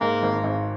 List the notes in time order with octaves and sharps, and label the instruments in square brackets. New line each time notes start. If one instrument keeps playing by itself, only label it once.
[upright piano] G#2 [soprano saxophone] A#3
[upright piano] G#1
G#1